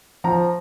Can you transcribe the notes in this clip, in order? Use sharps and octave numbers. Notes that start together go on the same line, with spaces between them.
F3 A#5